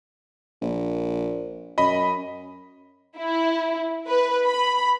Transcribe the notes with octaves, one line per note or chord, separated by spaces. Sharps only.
A#1
F#2 D#5 B5
E4
B4
B5